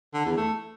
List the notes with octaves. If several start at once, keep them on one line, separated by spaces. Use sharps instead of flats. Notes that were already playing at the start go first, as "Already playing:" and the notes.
D3
E2
A3